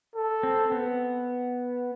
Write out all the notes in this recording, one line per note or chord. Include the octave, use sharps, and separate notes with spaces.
A4
C4
B3